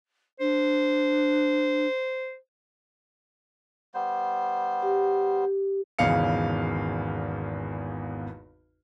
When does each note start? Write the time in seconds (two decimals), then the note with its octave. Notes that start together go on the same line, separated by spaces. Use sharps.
0.40 D4 C5
3.94 G3 B3 C5
4.82 G4
5.99 G#1 E2 C#3 F5 C#7